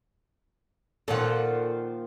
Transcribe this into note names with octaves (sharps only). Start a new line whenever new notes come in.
A#2 D#3 F3 A4 F#5